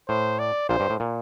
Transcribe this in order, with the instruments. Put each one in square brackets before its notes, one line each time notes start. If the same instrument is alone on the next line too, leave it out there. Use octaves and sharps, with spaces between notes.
[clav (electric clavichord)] A2 [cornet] C5
[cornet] D5
[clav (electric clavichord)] A#1 A#2 [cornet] C5
[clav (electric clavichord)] G2
A2
A#2